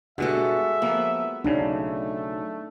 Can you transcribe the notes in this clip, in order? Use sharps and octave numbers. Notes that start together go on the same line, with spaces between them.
G2 B2 G#3 F#4 A4 E5 F#5
F3 A#3 B3
B1 C#3 A3 D4 D#4